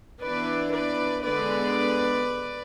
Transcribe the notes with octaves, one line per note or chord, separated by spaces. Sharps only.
E3 B3 D4 B4 D5
B4 D5
D3 G#3 B3 B4 D5